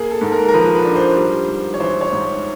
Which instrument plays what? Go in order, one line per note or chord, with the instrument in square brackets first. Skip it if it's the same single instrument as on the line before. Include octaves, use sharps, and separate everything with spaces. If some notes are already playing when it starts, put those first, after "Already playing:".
Already playing: [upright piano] A#3 [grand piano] G#4
[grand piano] A4
[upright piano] G#2
[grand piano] A#4
A#4
[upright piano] F3 [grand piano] B4
[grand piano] B4
[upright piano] D4
[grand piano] C5
[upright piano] G3
G#2
[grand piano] C#5
[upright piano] E3 [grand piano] C5
[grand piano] C#5
[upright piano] G#2